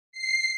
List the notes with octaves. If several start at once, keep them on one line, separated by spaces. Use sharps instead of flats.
C7